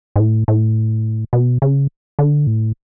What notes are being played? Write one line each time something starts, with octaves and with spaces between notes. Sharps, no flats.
G#2
A2
A2
B2
C#3
D3
A2